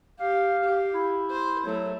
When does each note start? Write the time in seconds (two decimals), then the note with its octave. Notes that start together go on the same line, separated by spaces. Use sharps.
0.20 G4 F5
0.63 G4
0.94 E4
1.30 C5
1.66 F#3 A3